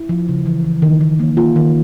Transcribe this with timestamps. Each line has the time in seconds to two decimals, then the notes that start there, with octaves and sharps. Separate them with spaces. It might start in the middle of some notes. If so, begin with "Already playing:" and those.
Already playing: E4
0.09 F3
0.29 C#3
0.46 E3
0.64 E3
0.82 D#3
1.01 D#3
1.19 A#3
1.37 A#3 F4
1.56 D#3